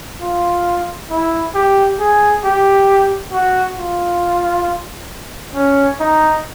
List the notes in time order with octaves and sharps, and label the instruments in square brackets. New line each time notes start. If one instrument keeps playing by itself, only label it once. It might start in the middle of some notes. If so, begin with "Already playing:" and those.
[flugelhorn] F4
E4
G4
G#4
G4
F#4
F4
C#4
D#4